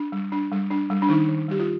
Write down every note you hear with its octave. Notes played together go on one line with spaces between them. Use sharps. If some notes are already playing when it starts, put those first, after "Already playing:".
Already playing: D4
G3
D4
G3
D4
G3
D4
D#3 D#4
D#3
G3 G4
F4